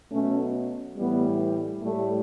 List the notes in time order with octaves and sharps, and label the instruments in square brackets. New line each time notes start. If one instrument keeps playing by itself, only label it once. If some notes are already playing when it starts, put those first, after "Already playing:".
[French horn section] B2 F#3 A3 C#4
A2 E3 G3 B3
A2 G3 A3